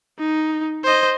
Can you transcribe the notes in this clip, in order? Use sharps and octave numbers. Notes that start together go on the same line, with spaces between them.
D#4
C5 D#5